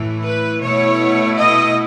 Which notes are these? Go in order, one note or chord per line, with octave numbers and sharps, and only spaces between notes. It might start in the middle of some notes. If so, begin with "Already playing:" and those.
Already playing: A2 E3 A3 E4
B4
B2 A3 E4 C#5
D#5